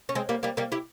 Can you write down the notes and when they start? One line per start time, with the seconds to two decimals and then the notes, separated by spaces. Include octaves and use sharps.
0.09 C#4
0.15 G#3 C4
0.29 G3 A#3
0.43 G3 A#3
0.57 G3 A#3
0.72 E4 G4